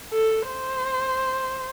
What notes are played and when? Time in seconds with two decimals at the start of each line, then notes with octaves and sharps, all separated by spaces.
0.12 A4
0.50 C5